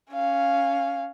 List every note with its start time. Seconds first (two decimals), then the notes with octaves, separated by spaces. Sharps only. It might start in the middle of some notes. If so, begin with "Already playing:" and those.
0.13 C#4 F5